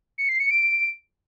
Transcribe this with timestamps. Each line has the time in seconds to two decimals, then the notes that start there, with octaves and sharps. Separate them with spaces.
0.18 C#7
0.29 C7
0.40 C#7
0.51 D7